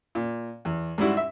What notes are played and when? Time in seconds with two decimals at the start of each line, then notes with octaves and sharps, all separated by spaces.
0.15 A#2
0.65 E2
0.98 G#2 G3 E4 F#4
1.17 E5